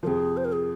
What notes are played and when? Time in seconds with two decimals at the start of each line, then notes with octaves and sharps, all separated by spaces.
0.03 F2 C3 F3 G#4 A#4
0.37 C5
0.45 A#4
0.52 G#4